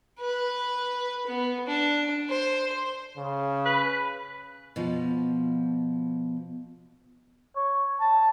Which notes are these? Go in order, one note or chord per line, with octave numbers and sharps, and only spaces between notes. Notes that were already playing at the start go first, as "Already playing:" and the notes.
B4
B3
D4
C5
C#3
B4
B2 F3
C#5
A5